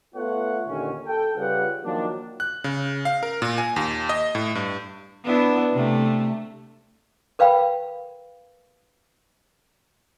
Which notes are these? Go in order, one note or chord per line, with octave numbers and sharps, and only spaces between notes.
A3 B3 F4 A4 C#5 F#5
D#2 A#2 D3 D#3 C#4
A4 G5
C#3 G3 F4 B4 F#5
D#3 F3 F#3 A#3 D4
F#6
C#3
F5
A#4
A#2
G#5
D#2
D#5
A2
G2
B3 D4 E4
C3 A3
A#4 B4 F5 G5 B5